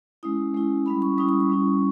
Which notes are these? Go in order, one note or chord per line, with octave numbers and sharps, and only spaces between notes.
G#3 C#4 E4 D#6
G#3 C#4 E4
G3 C#4 E4 B5
C#6
G3 C#4 E4 D#6
D#6
C#6
G3 C#4 E4